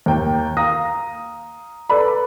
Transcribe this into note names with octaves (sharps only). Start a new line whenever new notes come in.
D#2 A#3 G5
F5 A#5 D#6 A#6
A4 B4 D5 B5